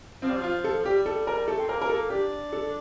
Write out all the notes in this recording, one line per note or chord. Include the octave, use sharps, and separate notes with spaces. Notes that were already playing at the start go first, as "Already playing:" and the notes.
F3 C4
G3
F3
F4
A4
F3
G3 G4
A4
A#4
A3 A4
C4
A#3 A#4
A#4
A#3 A4
D4 G4
A4